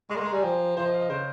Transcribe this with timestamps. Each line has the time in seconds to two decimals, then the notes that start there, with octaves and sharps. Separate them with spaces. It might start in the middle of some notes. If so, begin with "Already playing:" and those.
0.10 G#3 C#6
0.16 A#3 C6
0.20 G#3
0.26 A#5
0.32 G3 G#5
0.43 F3 G5
0.77 F3 C5
0.84 D#5
0.94 F5
1.01 D#5
1.09 C#3 C5